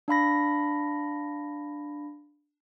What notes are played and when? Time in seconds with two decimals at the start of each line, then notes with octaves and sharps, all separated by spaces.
0.08 D4 F5 B5 A#6